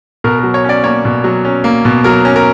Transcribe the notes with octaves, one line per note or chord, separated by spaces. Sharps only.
B2 A#4
F#3 A#4
C#5
C#4 D5
A#3 C#5
B2
F#3
C#4
A#3
B2
F#3 A#4
C#4
A#4